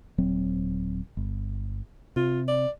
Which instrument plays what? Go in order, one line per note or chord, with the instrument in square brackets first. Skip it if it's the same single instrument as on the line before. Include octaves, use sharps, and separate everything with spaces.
[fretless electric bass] D#1 F#3 C4
G1
[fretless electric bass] C3 [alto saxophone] F4
[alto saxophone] D5